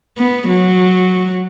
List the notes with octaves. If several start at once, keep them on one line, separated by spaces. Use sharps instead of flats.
B3
F#3